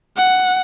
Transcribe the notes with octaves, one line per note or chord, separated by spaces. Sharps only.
F#5